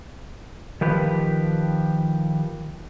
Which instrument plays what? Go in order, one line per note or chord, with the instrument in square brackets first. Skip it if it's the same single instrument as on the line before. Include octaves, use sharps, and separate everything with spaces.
[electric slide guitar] D#3 F3 G4 B4